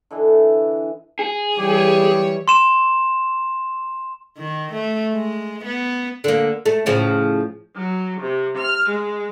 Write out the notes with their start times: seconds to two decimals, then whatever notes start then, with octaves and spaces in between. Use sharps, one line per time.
0.11 D3 E3 E4 D#5
1.19 G#4
1.57 E3 G3 G4 C#5
2.48 C6 E7
4.38 D#3
4.73 A3
5.14 G#3
5.65 B3
6.24 D3 A#3
6.66 A3
6.86 A2 C#3 F3
7.75 F#3
8.20 C3
8.56 F6
8.89 G#3